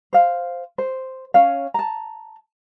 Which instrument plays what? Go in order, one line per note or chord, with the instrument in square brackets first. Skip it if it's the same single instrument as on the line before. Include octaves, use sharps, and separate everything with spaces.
[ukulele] C5 F5
C5
C#4 C#5 F5
A5 A#5